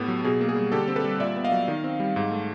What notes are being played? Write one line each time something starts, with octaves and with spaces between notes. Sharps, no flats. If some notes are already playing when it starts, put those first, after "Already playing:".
Already playing: A2 B3 G4 A4
F#3
B2 G#4
A#3
G#4
G3
D3 G4 A4
C4
A4 B4
G3
A#2 D5 E5
B3
D#5 F5
F#3
D#3
C4
G3
G#2
A3